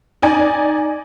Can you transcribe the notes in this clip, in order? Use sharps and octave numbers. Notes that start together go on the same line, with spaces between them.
D#4 D5 G#5